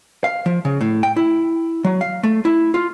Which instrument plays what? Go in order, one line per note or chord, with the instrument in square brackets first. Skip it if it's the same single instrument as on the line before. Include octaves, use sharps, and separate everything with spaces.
[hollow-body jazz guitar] F5
F3
C#3
A2
G5
E4
F#3
F5
A3
E4
F4